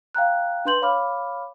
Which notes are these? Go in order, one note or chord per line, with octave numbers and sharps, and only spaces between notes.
F5 G5 A#5 F#6
D4 B4 C6 G6 F#7
C#5 F5 B5 D6 F6